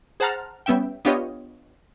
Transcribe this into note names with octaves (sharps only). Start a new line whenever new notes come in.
G#4 C5 F#5 A5 A#5 F6
G3 B3 C#4 E5 G5
B3 D4 F4 G4 C#5 D#5